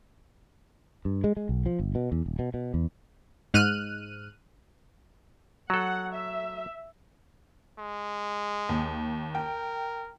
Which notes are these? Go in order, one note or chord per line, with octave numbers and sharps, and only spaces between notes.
G2
G#3
G#3
B1
F3
G1
B2
E2
D#1
B2
B2
E2
G#2 F6 F#6 D#7
F#3 A4 F#5
E5
G#3
D#2
A#4 G5